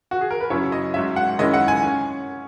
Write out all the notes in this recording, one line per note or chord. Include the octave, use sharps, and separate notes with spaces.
F#4
G#4
A#4
B4
F#2 C#3 F#3 C#4 E4 C#5
D#5
G#2 F#3 C#4 E5
F#5
F#2 D#3 G#3 C#4 E4 D#5
F#5
G#5
C#4